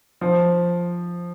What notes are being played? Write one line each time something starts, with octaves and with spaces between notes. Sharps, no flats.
F3